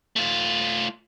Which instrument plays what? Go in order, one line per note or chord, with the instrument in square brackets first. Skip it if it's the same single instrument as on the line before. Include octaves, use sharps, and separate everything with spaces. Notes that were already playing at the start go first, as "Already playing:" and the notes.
[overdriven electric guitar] A3 F4